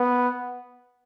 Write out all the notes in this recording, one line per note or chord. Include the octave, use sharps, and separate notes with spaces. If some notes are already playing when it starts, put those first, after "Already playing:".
Already playing: B3